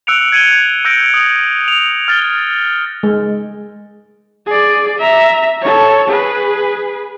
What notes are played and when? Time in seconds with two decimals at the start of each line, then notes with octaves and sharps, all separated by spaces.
0.07 E6 F#6 C#7 D7 F7
0.32 G#6 C#7 D#7 F#7 G7
0.85 E6 G6 A#6 D7 D#7
1.14 D#6 F#7
1.68 F7
2.08 F6 A6 F7 G7
3.03 G#3
4.46 G#4 D5
4.98 E5 A#5
5.62 A4 C#5
6.08 G#4 B4